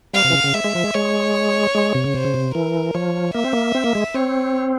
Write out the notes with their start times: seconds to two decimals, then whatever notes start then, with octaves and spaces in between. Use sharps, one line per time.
0.14 G3 F5
0.24 C3
0.30 E3
0.34 C#3
0.44 C#3
0.54 G#3 E5
0.64 G#3
0.75 F3
0.84 G#3
0.94 G#3 C#5
1.75 G#3
1.95 C3
2.04 C#3
2.14 C3 C5
2.25 C#3
2.34 C3
2.54 E3 A#4
2.94 F3 C#5
3.35 A#3 E5
3.45 C4
3.53 A#3
3.75 C4
3.84 A#3
3.95 G#3
4.14 C4 C#5